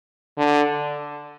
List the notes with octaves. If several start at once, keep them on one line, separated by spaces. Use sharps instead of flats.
D3